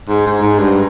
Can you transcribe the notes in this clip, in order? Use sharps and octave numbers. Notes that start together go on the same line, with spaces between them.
G#2
G#2
G#2
G2